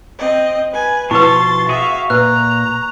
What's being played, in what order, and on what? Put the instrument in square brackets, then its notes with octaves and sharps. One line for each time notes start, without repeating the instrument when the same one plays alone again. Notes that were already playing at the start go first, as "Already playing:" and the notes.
[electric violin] C4 D#5
B4 G#5
[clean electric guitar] B2 F3 A4 [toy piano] E4 B4 [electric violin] C6 A6 [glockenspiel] C#6
[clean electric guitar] F#4 G#4 [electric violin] E5 F5
[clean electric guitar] A#2 [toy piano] B4 [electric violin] A#5 [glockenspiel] F#6